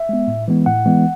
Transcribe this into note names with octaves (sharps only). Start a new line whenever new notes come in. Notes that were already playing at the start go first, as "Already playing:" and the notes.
Already playing: E5
G#3 B3
A2
E3 G#3 B3
A2 F#5
E3 G#3 B3